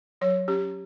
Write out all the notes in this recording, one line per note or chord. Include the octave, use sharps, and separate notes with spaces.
F#3 C#5
C#4 G4